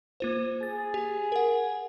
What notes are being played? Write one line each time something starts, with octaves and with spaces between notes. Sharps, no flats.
A#3 F4 C5
G#4 A6
G4
A#4 F#5